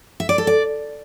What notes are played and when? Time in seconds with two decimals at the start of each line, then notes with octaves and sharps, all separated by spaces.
0.20 E5
0.29 D5
0.38 A4
0.47 D5